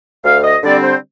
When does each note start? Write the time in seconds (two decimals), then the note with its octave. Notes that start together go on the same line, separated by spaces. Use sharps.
0.25 D2 F5
0.44 D#5
0.63 D3 G3 C4 D5
0.83 C5